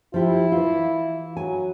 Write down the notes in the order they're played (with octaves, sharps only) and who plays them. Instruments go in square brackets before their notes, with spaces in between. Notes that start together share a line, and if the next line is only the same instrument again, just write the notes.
[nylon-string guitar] F3 G4 [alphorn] E4
[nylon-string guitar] E3 F4
[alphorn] F#3 [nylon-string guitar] G#5